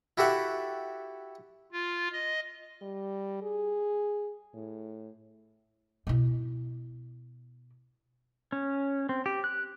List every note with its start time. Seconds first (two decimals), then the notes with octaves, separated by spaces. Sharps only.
0.17 E4 F#4 G4 A4 E5 F#5
1.72 F4
2.12 D#5
2.82 G3
3.42 G#4
4.54 A2
6.07 B2 E4
8.52 C#4
9.09 C4
9.26 G4
9.44 F#6